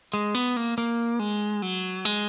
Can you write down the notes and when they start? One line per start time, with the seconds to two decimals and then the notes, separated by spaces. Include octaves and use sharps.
0.14 G#3
0.35 B3
0.57 A#3
0.78 A#3
1.19 G#3
1.62 F#3
2.05 G#3